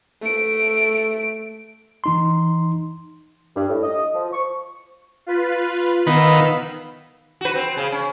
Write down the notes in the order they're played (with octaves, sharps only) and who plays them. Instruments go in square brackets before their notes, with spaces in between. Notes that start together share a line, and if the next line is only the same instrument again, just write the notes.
[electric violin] A3 D7
[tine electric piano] E3 D#4 C6
[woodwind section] G2
A2
D#5
F3
C#6
[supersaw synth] F4 B4
[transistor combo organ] D#3 B4 [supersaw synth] B3 F5 E6
[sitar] F#4 B4
C4
C#3
C#4